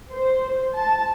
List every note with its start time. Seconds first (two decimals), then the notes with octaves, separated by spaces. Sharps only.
0.11 C5
0.73 A5